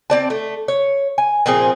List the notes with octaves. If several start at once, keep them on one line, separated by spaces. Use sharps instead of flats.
C4 D5 A5
A3
C#5
G#5
A#2 F3 C4 G#4